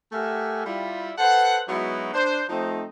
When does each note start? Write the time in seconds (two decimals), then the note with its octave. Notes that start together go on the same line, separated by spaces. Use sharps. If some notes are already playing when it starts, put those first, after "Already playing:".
0.12 A3 G4 A#4 E5 F#5 G#5
0.66 G3 E4 F4
1.18 A4 B4 C5 F#5
1.68 F#3 G#3 B3 D#4 E4 F#4
2.13 D4 C5
2.49 F3 A3 C4 D#4